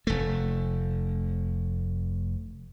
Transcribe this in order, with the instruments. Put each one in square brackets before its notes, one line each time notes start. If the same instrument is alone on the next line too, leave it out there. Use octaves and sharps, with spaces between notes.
[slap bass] F1 A3